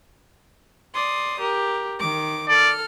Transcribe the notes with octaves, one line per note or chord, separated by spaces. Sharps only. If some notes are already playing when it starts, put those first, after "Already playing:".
D5 C6 D#6
G4 A#4
D#3 D6
A4 D5 F6